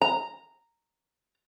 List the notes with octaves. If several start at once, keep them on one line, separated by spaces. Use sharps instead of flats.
A#5